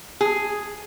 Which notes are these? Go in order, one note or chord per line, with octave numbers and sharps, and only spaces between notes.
G#4